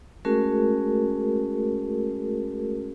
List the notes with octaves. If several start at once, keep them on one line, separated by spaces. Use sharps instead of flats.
G#3 A3 C#4 F#4 G#4 A#4